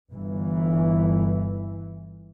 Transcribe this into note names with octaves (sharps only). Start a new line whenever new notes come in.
G1 E3